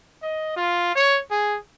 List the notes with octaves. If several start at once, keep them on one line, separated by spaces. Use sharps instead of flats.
D#5
F4
C#5
G#4